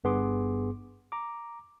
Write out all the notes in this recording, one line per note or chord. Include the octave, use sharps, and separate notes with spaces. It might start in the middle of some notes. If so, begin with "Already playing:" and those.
G1 G2 B3 G#4 C6 D6
A#5 D6